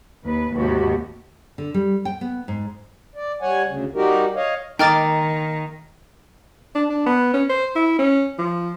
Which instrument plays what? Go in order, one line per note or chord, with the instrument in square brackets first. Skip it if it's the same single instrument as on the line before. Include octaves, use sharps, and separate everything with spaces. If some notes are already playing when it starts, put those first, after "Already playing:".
[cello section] D#2 B4
D#2 G#2 C3 F#4 G4
[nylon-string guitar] D3
G3
G5
B3
G#2
[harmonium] D5
G3 C#5 F#5 G#5
D2 C#3
G3 D#4 F#4 G4 A#4
C#5 D#5 F5
[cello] D#3 [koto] A#3 [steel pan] D#4 D6 [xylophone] G5 F6 A6
[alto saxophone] D4
D4
B3
C#4
C5
E4
C#4
F3